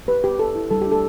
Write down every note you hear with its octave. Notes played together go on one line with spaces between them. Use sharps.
G4 B4
B3 G4
G4 A4
E4
G3 A4
G4
D4 A4